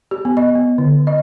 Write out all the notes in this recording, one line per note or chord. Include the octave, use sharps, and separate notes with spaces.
G4
B3
D#5
B3
D3
D#5